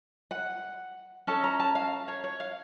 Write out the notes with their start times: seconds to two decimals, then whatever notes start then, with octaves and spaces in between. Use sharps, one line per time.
0.31 F#5
1.27 C#4 A4 A5
1.44 A#5
1.60 A5
1.75 F5
2.08 C#5
2.24 C#5
2.40 F5